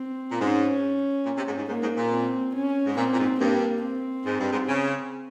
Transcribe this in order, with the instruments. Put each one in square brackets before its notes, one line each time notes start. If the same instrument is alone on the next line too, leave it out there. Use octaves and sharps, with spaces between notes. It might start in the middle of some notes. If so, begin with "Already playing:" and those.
Already playing: [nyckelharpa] C4
[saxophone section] A#2
[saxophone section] G#2 [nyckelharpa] C#4
[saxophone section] A#2
C3
G#2
G#2
[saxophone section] G#2 [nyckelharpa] A#3
[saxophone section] G#2
A#2
[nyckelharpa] C4
C#4
[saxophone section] G#2
[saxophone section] A#2 [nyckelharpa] C4
[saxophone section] A#2
G#2
[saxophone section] G2 [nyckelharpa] A#3
[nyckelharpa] C4
[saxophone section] G#2
G2
G#2
C#3